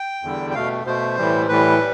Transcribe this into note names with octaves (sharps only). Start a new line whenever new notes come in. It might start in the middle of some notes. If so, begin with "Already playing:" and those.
Already playing: G5
E2 D3 G3
G5
B2 A3 F5
B2 A3 C5
A2 E3 G3
A2 E3 G3 B4
G3